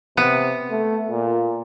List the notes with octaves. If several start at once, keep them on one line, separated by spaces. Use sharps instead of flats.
C3 B3
A3
A#2